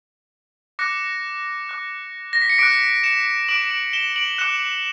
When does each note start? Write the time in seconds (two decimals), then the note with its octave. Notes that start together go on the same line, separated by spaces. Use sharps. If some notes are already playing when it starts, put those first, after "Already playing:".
0.79 D6 F#6 A#6 C#7
1.69 D6 F#6
2.33 A#6
2.42 B6
2.50 C#7
2.58 D6 F#6 B6 D7
3.03 C#7 E7
3.48 D6 F#6 D7 F#7
3.62 E7
3.71 D7 F#7
3.93 E7 G7
4.16 D7 F#7
4.38 D6 F#6 C#7 E7